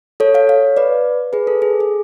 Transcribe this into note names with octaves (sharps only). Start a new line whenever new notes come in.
A4 C#5
C#5 F5
C#5 F5
B4 D5
G#4 B4
A4
G#4
G#4